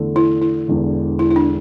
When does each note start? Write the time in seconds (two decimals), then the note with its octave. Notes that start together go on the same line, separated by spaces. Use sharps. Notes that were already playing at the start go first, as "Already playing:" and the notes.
Already playing: E2 D3 A3
0.16 E4
0.42 E4
0.68 E1 E2 D3
1.19 E4
1.31 E4
1.36 D4